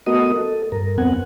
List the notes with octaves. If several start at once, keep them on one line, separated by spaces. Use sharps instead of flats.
A3 B3 F#4 A#4 D#5 D#6
A4
G2 A#4
F2 B3 C4 F#5 G#5